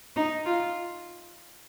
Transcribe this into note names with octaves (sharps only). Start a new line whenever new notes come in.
D#4
F4